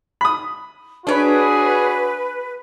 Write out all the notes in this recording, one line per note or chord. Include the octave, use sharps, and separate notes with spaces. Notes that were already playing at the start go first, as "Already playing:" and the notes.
B5 D#6
D4 F#4 G#4 B4 C#5